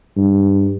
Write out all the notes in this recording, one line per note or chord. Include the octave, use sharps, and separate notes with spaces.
G2